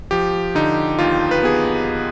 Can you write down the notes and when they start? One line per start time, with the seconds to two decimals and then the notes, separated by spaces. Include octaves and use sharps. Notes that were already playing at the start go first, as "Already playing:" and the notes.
0.11 F3 G4
0.55 D3 D#4
0.99 D#2 F4
1.31 B4
1.43 B3 G#4